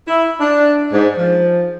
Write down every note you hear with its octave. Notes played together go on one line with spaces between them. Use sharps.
E4
D4
G#2
F3